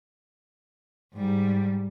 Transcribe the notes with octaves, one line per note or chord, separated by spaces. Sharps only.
G#2 G3